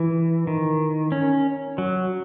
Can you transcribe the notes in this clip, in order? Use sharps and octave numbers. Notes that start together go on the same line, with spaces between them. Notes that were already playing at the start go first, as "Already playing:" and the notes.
Already playing: E3
D#3
C#4
F#3